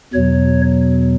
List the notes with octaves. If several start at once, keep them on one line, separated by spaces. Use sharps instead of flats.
E2 B2 F#3 C#5